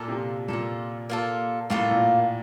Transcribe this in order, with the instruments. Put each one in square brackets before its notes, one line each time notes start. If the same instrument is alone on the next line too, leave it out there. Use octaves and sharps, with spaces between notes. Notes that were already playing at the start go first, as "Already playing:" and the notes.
Already playing: [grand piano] A#2 [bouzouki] A#3 F4 A4
[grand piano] C3
[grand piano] A#2 [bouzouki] A#3 F4 A4
[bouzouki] A#3 F4 A4
[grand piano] A2 [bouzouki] A#3 F4 A4
[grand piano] A#2